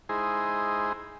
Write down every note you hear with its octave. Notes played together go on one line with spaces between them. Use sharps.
G#3 D#4 E4 G#4 C5